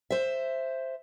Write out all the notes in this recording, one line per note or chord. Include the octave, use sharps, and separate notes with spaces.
C5 E5